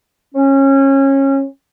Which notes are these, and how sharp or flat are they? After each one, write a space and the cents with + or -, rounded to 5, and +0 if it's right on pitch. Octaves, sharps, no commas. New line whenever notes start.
C#4 -25